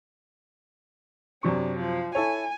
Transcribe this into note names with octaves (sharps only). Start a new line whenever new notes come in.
F#2 C3 D4 C#6
F3
E4 A4 C#5 G#5